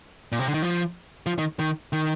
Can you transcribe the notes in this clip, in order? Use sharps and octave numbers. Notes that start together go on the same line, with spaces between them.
A#2
C3
D3
D#3
F3
F3
D#3
D#3
D#3